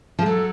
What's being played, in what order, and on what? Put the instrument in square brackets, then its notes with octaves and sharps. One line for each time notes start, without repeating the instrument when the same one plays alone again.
[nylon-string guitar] F3
[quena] G#4
[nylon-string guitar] F#3 [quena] A4